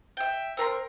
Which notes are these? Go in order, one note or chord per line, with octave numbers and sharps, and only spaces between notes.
E5 G5
C4 A#4 B5 C6